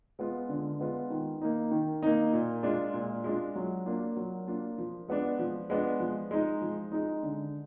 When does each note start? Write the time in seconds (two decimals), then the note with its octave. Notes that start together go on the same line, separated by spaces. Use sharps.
0.19 G#3 B3 F4
0.49 D3
0.79 G#3 B3 F4
1.10 D#3
1.42 A#3 D#4
1.71 D#3
2.02 A#3 D#4
2.33 A#2
2.63 G#3 D4 F4
2.93 A#2
3.24 G#3 D4 F4
3.55 F#3
3.86 A#3 D4 F4
4.16 F#3
4.47 A#3 D4 F4
4.78 F3
5.08 G#3 B3 D4
5.39 F3
5.70 G#3 B3 D4
6.00 F3
6.31 G#3 D#4
6.61 F3
6.92 G#3 D#4
7.23 D3